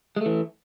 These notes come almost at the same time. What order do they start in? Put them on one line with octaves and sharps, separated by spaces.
G#3 A3 E3